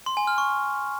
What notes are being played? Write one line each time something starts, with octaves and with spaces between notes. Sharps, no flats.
C6
G#5
F6
C#6